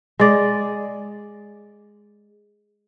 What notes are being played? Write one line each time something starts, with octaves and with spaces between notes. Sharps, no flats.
G#3 D5